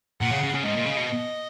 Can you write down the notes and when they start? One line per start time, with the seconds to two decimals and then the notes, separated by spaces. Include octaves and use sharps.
0.21 A#2 F#5
0.32 C#3
0.43 C#3
0.54 C#3
0.64 G#2 D#5
0.75 A#2
0.85 C#3
0.97 B2